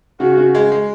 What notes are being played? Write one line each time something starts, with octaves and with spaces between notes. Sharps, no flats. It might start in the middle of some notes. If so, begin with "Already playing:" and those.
C#3 F#4
C#3
G#3
G#3